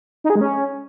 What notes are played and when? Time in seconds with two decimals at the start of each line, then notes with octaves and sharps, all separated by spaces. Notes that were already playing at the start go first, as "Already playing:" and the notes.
0.24 D#4
0.30 G#4
0.35 G#3
0.41 C#4